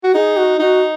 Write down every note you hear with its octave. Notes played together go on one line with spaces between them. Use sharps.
F#4
D#4 G#4
F#4
D#4 F#4